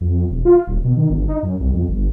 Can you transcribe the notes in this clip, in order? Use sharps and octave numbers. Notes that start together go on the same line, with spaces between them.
F2
E1
F4
D#1
B2
D#3
G1
D#4
F#2
C2
F2
G1